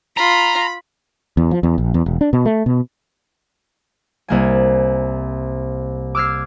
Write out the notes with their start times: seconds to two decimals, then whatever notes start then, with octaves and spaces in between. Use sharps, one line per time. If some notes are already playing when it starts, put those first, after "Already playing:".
0.17 F4 A#5 B5
1.37 E2
1.51 F3
1.63 E2
1.78 A#1
1.94 E2
2.06 E1
2.21 D4
2.33 B2
2.45 A3
2.66 B2
4.28 C2 A#3 G#5
6.15 D6 E6 F6 G#6 C7